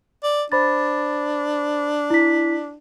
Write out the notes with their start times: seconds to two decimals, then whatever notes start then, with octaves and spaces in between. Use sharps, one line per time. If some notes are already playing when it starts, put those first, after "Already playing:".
0.23 D5
0.52 D4 C5 B5 A6
2.10 E4 B6